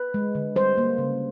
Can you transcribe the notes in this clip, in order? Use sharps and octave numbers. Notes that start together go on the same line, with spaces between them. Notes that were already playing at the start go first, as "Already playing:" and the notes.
Already playing: B4
G#3
D3
G3 C5
A#3
C#3